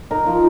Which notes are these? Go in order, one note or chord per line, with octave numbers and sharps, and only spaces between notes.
D#4 A#4
F3